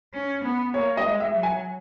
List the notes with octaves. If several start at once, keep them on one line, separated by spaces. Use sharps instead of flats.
C#4
B3
A#3 C#5
D#5
G#3
E5
F#3
G#5